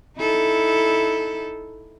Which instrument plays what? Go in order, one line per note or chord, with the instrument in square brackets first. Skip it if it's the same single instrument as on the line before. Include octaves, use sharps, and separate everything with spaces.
[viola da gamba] D#4 E4 A4